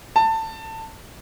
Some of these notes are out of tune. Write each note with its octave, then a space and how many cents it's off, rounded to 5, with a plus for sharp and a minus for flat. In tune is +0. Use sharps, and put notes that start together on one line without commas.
A5 +20